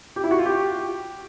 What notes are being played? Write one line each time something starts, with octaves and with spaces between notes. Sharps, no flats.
G4
E4
F#4
F4
G4